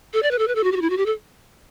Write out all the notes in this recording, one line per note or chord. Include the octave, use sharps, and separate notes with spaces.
A4
D5
B4
A4
B4
A4
F#4
G4
F#4
E4
F#4
G4
A4